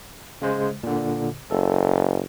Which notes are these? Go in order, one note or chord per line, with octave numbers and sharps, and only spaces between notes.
C#3 G#3 C5
A#2 D3
F#1 A4